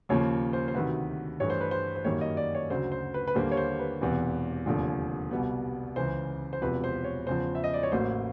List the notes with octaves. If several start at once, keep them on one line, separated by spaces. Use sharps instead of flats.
D#2 C#3 F3 A#3 C#5
C5
C5
D2 C3 D#3 F#3 B4
G2 E3 A3 C#5
C5
B4
C5
C5
F#2 D#3 G3 A#3 C#5
D#5
D5
C#5
D2 C#3 F#3 C5
C5
B4
B4
D#2 D3 G3 A#3 C5
C#5
C5
B4
E1 E2 C3 E3
F1 D#2 D3 F3
C2 B2 G3 B3
C#2 C#3 E3 C5
C5
E1 E2 C3 F3 B4
C5
C#5
E2 C#3 F3 C5
E5
D#5
D5
C#5
A1 A2 F#3 A#3 C5